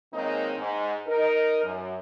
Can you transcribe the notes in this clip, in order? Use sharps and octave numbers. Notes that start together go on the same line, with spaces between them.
D#3 G#3 A#3 C4 C#4 D#4
G#2
D#4 A#4
F#2